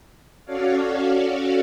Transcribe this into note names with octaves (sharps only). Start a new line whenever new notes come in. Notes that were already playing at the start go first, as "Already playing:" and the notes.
C#4 F#4 A4 C#5 D5 F5